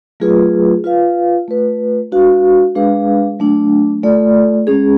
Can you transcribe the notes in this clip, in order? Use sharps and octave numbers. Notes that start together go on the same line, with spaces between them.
F#3 A3 F4 G#4 B4
F4 B4 F5
A3 F4 B4
G#3 D4 F#4 B4 F5
G#3 D4 G#4 B4 F5
F#3 A3 D4
A3 F4 A4 D5
G#3 C#4 G#4